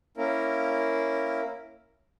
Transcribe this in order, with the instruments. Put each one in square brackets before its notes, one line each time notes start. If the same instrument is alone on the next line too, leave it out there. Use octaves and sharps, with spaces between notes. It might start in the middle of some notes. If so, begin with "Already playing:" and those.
[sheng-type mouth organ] A#3 C#4 E4 A#4